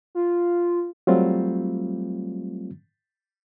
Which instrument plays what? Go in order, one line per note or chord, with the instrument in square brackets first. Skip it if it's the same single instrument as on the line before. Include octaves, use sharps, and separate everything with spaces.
[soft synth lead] F4
[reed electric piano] F#3 G3 A3 C4 F4